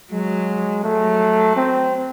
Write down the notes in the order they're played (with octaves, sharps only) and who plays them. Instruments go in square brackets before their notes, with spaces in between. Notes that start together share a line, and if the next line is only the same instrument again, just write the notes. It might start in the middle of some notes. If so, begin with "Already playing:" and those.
[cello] F#3 [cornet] G#3
[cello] F#3 [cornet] A3
[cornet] C4